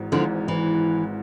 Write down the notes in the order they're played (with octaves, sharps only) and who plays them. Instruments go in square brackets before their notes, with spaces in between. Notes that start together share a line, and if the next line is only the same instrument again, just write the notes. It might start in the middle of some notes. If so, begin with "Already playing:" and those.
Already playing: [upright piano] G#1 G#2 E3
[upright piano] G#1 G#2 E3 [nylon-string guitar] D3 F3
[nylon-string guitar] E3